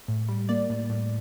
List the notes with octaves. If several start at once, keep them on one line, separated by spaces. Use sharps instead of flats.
A2
G3
A#3 D5
A2
A2